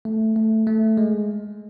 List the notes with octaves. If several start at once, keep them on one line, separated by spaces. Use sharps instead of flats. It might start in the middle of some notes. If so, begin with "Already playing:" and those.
A3
A3
A3
G#3